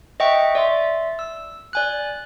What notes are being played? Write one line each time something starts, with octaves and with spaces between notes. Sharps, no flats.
D#5 E5 F#5 G5 C#6
D5 E5 C6
E6
D5 G#5 F#6